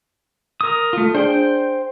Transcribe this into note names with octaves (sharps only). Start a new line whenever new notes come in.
A#4 D#6
A3 F4 D#6
D4 G#4 C5 G5